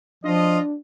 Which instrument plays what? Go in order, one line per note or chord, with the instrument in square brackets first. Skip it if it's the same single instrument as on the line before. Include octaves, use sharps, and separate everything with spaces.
[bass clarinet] F3 [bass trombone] D4 [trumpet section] F4 D#5